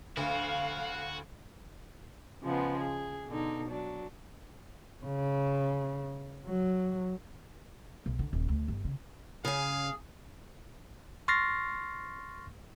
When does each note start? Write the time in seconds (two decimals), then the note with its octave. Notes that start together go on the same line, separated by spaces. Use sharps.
0.17 D2 F#4 F5
2.43 C#3 F3 G#3 B3
2.77 G#4
3.27 B2 D3 D#4
3.69 F#3 D4
5.05 C#3
6.46 F#3
8.06 B1
8.19 D3
8.33 D#1
8.49 D2
8.68 G1
8.85 C#3
9.45 C#3 G#4 F5 G#5
11.28 C6 C#6 F6 A6 A#6 C7